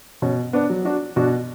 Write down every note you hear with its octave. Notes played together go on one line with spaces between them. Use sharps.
B2 C#4
B3 D4
F#3
D4 F#4
B2 D4 F#4